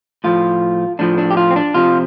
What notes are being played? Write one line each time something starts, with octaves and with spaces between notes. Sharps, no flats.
A2 F3 F4
A2 F3 D4
D4
G4
F4
C4
D4
C3 F3 F4